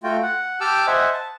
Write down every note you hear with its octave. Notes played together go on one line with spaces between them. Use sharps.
A3 F4 F#4 G5
F#5
G4 G5 A5 D6 E6 F6
C5 D#5 E5 F#5 G#5
A5